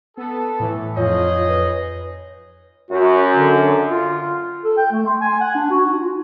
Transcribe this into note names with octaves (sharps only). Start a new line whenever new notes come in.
B3 A4
A2 E3
F2 D#4 F4 G#4 C#5 D#5
B4
F#2 F#4
D3
F4
A4
G5
A3
C6
G#5
F#5
D4
F#4
D#4
F4